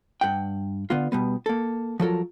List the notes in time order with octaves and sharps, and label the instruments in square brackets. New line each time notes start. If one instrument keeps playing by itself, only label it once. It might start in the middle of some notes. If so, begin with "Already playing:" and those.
[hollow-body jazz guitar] G2 F#5 G5
D3 B3 F4
B2 G3 B3
A#3 A4
F3 F#3 A4 A#4